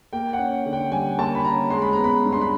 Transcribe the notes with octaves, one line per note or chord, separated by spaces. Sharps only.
A#3 G5
F#5
C#4
D3
G5
G3 G#5
A#3 A5
B5
C#4 A#5
G#3 C6
B5
B3 A#5
B5
G2
C6
B5